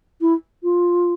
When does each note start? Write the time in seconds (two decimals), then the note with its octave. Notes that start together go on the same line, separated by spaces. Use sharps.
0.21 E4
0.63 F4